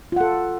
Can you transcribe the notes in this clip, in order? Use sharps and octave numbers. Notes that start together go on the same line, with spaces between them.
F4 A4 F#5